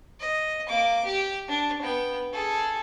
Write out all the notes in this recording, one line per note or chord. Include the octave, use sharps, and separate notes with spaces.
D#5
A#3 D6
G4
D4
B3 G5
G#4 A4